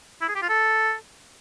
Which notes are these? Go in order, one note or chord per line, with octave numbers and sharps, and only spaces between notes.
E4
G#4
G4
F4
A4